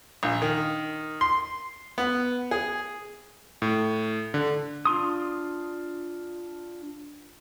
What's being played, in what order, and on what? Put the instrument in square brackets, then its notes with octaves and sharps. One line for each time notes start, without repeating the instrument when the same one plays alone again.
[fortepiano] A#1
D#3
C6
B3
G#4
[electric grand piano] A2
D3
[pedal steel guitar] D4 F4 C6 D#6